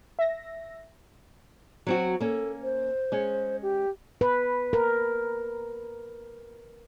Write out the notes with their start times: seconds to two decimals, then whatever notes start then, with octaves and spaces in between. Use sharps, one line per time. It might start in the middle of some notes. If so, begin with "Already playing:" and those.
0.19 E5 A#6
1.87 F#3 C4 F#4
2.21 A#3 C#4 A4
2.63 C5
3.12 G#3 C#4
3.62 G4
4.21 B4
4.73 A#4